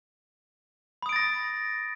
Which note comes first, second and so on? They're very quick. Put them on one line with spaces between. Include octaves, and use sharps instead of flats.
B5 D#6 D7 A6 A#6